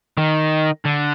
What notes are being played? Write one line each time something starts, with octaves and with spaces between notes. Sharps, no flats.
D#3
D3